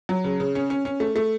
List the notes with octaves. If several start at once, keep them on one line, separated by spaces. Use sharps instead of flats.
F#3
C#3
C#3
C#4
C#4
C#4
A3
A3